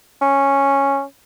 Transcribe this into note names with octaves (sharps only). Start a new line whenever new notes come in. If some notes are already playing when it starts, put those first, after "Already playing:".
C#4